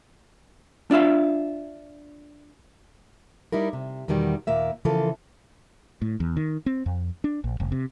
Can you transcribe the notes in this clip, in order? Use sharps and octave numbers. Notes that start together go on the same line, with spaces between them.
D4 F4 E5 F5
G3 D#4 E4 A#4
C3
E2 B2 D#3 G3
D#2 A#2 A#3 E5
C#3 E3 F3 A#3 F4 A4
A2
E2
D#3
C4
F2
D4
A#1
F1
C3